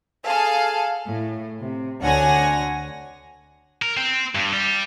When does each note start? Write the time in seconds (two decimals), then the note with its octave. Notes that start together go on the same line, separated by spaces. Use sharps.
0.26 G#4 A4 F5 A5
1.07 A2
1.62 C3
2.02 D2 D3 C#5 F#5 G#5 A#6
3.82 A#4
3.97 C4
4.35 G2
4.53 G3